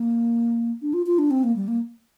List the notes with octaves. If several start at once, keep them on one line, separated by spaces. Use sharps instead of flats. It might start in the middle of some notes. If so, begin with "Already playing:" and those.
Already playing: A#3
D4
F4
F4
D4
C4
A#3
G3
A#3